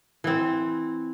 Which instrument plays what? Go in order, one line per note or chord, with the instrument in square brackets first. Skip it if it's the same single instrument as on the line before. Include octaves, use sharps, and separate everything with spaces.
[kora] E3 C4